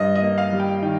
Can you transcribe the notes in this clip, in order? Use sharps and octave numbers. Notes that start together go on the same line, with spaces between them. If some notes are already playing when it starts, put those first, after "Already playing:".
Already playing: G2 D#5
D#5
A#3
F5
G3
G5
D#3 G5